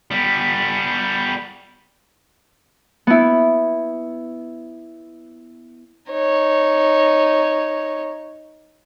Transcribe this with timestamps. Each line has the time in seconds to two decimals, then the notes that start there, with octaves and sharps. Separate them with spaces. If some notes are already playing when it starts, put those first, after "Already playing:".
0.11 G3 B3
3.07 B3 E4
6.11 D#4 C#5